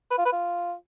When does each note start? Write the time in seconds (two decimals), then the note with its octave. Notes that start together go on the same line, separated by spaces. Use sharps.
0.11 B4
0.18 F4
0.25 B4
0.32 F4